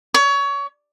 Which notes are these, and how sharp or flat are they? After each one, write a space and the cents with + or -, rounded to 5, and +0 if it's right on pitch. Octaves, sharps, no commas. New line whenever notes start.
C#5 +25